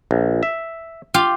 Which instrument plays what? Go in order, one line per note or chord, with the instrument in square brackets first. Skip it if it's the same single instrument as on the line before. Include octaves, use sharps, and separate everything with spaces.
[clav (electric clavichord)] A#1
E5
[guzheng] F4 G4 F5